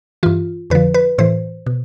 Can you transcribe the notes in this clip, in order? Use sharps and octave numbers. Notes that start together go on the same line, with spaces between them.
G2 E3 F4
F2 D3 F3 B4
B4
A2 E3 C5
B2